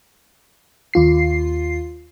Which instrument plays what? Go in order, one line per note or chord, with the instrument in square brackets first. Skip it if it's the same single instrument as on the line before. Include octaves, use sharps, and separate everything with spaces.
[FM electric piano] D#2 F4 C7